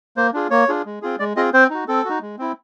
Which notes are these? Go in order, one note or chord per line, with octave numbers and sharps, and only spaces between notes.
A#3 C5
D4 F4 G#4
A#3 C#5
D4 F4 G#4
G#3
C4 F4 G#4
G#3 D5
C4 F4 G#4 D#5
C4 C5
D#4 F#4
C4 A4
D#4 F#4
G#3
C4 E4